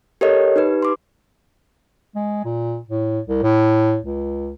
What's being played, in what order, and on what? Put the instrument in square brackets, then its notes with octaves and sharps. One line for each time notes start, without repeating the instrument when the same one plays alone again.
[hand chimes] G4 A4 A#4 C#5 D#5
D#4 G4 B4
C6 D6
[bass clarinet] G#3
A#2
A2
C2
A2
C#2